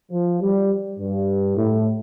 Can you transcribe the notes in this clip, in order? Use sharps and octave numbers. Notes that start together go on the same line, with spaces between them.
F3
G3
G2
A2